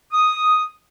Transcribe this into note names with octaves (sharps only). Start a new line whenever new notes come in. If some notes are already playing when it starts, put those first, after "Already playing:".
D#6